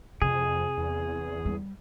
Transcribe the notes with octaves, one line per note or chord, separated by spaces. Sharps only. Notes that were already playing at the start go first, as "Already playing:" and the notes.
F2 C3 G#4
E2
G3